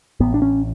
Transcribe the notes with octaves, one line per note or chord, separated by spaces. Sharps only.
A1 A2 B3
D4
C#4